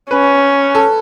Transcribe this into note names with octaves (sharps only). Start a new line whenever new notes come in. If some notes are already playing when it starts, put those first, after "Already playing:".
C#4 B4
A4